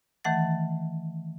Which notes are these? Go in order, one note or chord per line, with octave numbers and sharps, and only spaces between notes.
D#3 E3 A3 F#5 A6